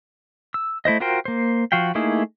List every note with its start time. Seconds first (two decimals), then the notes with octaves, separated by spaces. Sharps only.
0.54 E6
0.85 A3 E4 C5 D#5
1.00 F4 F#4 A#4 C5 G5
1.25 A#3 C5
1.72 F3 F#4 F5 G5
1.95 A3 A#3 D#4 E4 G#4